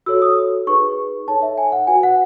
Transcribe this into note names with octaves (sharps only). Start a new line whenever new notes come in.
F#4 A4 C#5 E6
D#6
D#4 G#4 B4 C#6
D#4 A4 C#5 A5
E5
G#5
F#5
F#4 B4 G#5
F#5